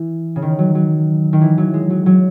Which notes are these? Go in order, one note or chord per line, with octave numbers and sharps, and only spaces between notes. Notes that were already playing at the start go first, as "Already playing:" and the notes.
Already playing: E3
C#3
D#3
F#3
F#3
D#3
E3
F#3
G#3
F#3
F#3